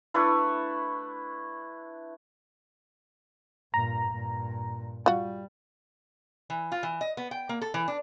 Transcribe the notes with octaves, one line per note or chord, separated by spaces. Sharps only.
A3 D4 E4 B4
G2 A#2 A#5
G2 A#2
G3 F4 F#4
E3
F4
E3
D#5
B3
G5
A#3
A4
E3
D4